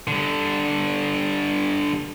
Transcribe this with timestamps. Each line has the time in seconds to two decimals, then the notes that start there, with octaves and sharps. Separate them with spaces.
0.08 D3 G3